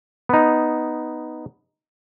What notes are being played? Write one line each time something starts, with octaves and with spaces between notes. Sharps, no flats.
B3 D#4